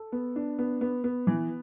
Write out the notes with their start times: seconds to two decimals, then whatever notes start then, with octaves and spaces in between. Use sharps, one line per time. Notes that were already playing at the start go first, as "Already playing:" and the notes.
Already playing: A4
0.12 B3
0.36 D4
0.59 B3
0.81 B3
1.04 B3
1.27 E3